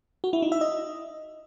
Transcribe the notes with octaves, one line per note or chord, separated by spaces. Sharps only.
F#4
E4
D#4
E5
D#5